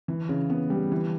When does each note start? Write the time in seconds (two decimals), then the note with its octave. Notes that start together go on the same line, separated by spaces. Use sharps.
0.08 E3
0.29 C#3
0.50 B3
0.70 G3
0.92 E3